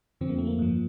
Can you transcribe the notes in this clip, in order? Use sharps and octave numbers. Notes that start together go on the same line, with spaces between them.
F2 D3 F3 C4
A#3
A3
A#3
G2 F3